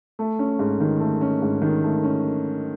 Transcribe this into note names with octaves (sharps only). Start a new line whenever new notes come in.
A3
C#4
G#2
D#3
A3
C#4
G#2
D#3
A3
C#4